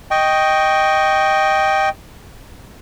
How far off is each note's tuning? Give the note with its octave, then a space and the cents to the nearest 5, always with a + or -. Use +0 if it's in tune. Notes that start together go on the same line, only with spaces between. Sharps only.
D#5 +0 G5 +0 C#6 +0